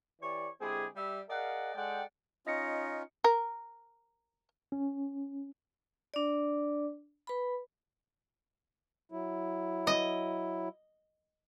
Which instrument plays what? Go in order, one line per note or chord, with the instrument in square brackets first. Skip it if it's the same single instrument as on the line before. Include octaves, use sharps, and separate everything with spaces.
[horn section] E3 G4 C#5 D5
D3 G#3 C4 E4 G4 G#4
G3 E5
G#4 A#4 D5 D#5 F5 F#5
G#3 A4 D5 F#5 G5
[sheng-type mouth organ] C#4 D#4 F4 [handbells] D#5 A#6 C#7
[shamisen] A#4
[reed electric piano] C#4
[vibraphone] D4 D5
B4 B5
[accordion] F#3 E4
[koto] D#5